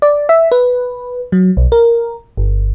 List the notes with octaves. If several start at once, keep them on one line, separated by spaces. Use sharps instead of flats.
D5
E5
B4
F#3
B1
A#4
G1